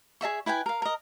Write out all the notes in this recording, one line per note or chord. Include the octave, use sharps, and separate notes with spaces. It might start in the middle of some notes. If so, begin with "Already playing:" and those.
G#4 D#5 E5 C#6
E4 B4 G5 G#5
A#4 F5
A#4 D#5